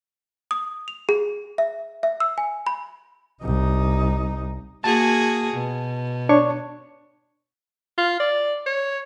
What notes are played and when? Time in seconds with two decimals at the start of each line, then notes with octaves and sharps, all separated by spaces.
0.51 D#6
0.88 F7
1.09 G#4
1.58 E5
2.03 E5
2.20 E6
2.38 G#5
2.67 B5
3.43 C2 D#4
4.84 A#3 F#4 G#4 A5
5.53 B2
6.29 D4 C#5 C#6
7.98 F4
8.20 D5
8.66 C#5